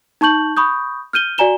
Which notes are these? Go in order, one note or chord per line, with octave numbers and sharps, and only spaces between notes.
D#4 A5 C#6 G6 F#7
B5 C#6 D#6 G6
F6 G6 D#7 G7
F#4 D5 G#5 A#5 E7 G7